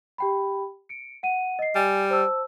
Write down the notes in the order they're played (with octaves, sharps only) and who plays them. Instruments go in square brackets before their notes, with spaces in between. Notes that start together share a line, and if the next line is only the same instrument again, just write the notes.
[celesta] G4 G5 B5
C#7 D7
F#5 D#7
D#5 C7
[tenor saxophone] G3 [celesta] G#5
[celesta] C5 A5 E6